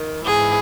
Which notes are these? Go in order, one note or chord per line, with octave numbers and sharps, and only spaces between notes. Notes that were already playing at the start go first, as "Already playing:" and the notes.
Already playing: D#3
G#2 E3 G#4